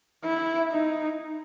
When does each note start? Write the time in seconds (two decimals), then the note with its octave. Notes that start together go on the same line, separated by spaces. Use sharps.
0.24 E4
0.71 D#4